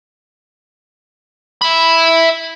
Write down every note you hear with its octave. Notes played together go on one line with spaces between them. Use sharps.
E5 B5